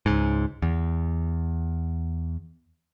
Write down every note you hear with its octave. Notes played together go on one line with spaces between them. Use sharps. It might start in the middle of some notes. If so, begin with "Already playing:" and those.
C#2 G#2
E2